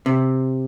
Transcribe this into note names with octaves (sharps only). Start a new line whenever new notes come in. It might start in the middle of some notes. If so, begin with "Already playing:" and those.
C3